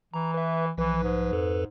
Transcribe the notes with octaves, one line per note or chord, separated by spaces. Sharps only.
E3 A#5
B4 E5
B1 E3 F3 B4
G#2
F2 A4 B4